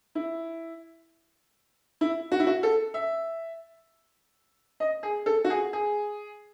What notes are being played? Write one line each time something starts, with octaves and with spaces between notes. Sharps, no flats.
E4
E4
F#4
E4
F#4
A4
E5
D#5
G#4
A4
F#4
G#4
G#4